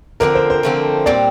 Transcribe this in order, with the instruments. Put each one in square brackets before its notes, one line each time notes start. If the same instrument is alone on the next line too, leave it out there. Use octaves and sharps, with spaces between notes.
[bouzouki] D3 F3 A3 C4 [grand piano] A#4
[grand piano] C5
C5
[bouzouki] D3 F3 A3 C4
[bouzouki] A#2 G3 C4 [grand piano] D5